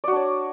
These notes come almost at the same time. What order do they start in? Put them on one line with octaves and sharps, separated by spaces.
D5 F#4 D4 C#5